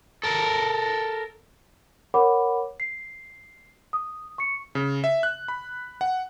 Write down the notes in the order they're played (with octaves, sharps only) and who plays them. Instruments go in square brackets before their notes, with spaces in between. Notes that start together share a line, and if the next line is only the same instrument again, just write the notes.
[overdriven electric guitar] A4 A#4
[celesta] A#4 C#5 F#5 B5 D6
C7
D#6
C#6 C#7
[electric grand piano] C#3
E5
F#6
B5
F#5